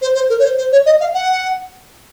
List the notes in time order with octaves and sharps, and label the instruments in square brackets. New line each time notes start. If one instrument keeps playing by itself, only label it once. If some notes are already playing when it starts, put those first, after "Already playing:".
[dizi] C5
C5
A#4
C#5
C5
C5
C#5
D#5
F5
F#5